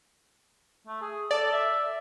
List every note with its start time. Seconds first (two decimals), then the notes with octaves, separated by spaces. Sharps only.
0.87 A3
1.01 G#4
1.31 A4 D5
1.52 E5